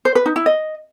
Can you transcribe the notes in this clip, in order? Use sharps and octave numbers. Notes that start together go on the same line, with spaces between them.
C5
B4
D#4
E4
D#5